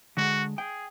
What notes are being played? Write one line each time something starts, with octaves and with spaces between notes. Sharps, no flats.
D3 G#3 F#4
G#4 G5